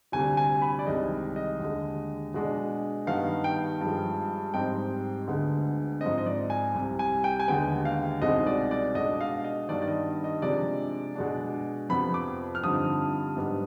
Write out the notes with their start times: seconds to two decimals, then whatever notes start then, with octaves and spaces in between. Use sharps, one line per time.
0.12 D2 C3 G3 D4 G#5
0.37 G#5
0.62 B5
0.79 D5
0.86 C2 C3 D#3 G#3 D#5
1.36 D#5
1.59 D#2 D3 G#3
2.34 B2 G#3 D4
3.07 G2 D#3 B3 D#4 F5
3.44 G5
3.81 G2 F3 G#3
4.54 G#2 G3 C4 D#4 G5
5.27 D2 D3 G#3 B3
6.01 G#2 F3 C4 D#5
6.18 D#5
6.26 D5
6.50 G#5
6.75 C2 C3 G3
6.99 G#5
7.24 G5
7.40 G#5
7.48 D#2 D3 G#3 B3 G5
7.85 F5
8.22 C2 B2 G#3 C4 D#4 D#5
8.46 D5
8.71 D5
8.95 B2 G#3 D4 D#5
9.21 F5
9.44 D#5
9.69 G2 D#3 B3 D4 D5
9.82 D5
9.88 D#5
10.24 D#5
10.42 C3 F3 G#3 D4 D5
11.15 B2 G#3 D4
11.89 F2 C3 F3 B3 B5
12.14 D6
12.55 F6
12.63 G2 D3 F3 C4 D#4 D#6
13.37 G#2 G3 B3 D4